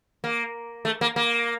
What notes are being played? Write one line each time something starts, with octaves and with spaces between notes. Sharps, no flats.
A#3
A3
A#3
A#3